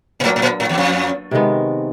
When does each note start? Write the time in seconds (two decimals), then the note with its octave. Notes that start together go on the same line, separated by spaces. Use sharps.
0.20 A#2
0.24 A2 F#3 A#3 D4
0.36 A2
0.42 A#2
0.60 A2
0.69 E2
0.78 F2
1.31 C3 D#3 G#3 B3